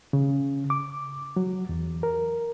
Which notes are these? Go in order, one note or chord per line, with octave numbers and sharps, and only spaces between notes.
C#3
D6
F#3
E2
A#4